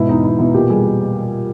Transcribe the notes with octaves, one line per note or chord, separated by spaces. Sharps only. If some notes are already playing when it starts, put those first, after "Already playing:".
Already playing: G#2 B2 E4
E2 D#4
E2 E4
B2 E4
A#2 G4
G3 G#4